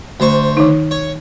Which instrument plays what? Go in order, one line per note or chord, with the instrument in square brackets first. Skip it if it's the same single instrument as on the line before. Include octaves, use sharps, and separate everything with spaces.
[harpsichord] D2 C5 C#6
[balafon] D#3 D#4
[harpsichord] C#5